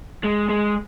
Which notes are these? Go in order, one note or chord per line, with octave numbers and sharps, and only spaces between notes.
G#3
G#3